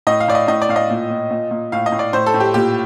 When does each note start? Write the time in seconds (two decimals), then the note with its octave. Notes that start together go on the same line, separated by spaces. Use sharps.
0.07 A2 D#5
0.20 F5
0.28 A2 D5
0.35 D#5
0.48 A2 D#5
0.62 D5
0.69 A2 F5
0.76 D#5
0.90 A#2
1.10 A#2
1.30 A#2
1.51 A#2
1.72 A2 F5
1.86 D#5
1.92 A2
1.99 D5
2.13 A2 C5
2.26 A4
2.34 A2
2.40 G4
2.54 A#2 G4